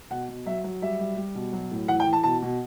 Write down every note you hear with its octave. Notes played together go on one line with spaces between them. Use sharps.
B2 F#5
B2
F#3 E5
F#3
G3 E5
G3
G3
B2
F#3
A2
E3 F#5
G5
E3
A5
B2 A5
B2